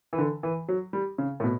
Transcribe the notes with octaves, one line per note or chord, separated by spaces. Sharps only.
E3
D3
E3
F#3
G3
C#3
A2
B2